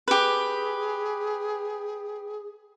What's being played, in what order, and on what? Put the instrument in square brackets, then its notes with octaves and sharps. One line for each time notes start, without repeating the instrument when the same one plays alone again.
[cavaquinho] G4 B4 [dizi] G#4